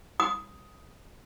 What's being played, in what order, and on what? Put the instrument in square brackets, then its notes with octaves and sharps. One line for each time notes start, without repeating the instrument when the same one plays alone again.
[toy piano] D#6